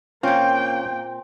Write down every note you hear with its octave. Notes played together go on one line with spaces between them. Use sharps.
A#2 A#3 C4 C#4 F4 G5